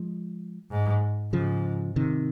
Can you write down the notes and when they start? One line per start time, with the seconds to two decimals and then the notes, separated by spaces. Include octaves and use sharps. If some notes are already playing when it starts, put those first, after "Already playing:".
Already playing: F3 G#3
0.71 G#2
1.33 G#2 C#3 F3
1.96 C3 D#3